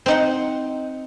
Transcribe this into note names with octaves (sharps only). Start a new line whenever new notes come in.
C4 D#4 F#5